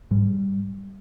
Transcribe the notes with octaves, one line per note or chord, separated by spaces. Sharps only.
G#2 G3